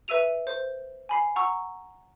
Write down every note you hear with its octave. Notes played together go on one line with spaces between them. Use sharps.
B4 E5 E6 D#7 F7
C5
G#5 B5 C7
F#5 A#5 C#6 E6